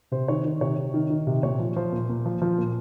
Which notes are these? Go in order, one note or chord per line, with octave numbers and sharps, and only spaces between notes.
C3 C5
D#3 C#5
D#3
C3 C#5
C3
D#3
D#3
C3
A#2 C#5
F3
F3 C5
A#2
A#2
F3
F3
A#2